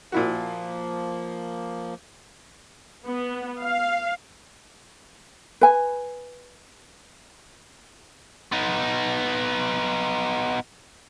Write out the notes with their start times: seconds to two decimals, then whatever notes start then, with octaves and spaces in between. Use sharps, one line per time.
0.12 A#2 F3 A#3 E4 F#4
3.06 B3
3.61 F5
5.61 B4 G#5
8.52 B3 D#4